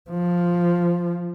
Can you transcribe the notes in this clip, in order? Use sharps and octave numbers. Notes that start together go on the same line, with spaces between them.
F3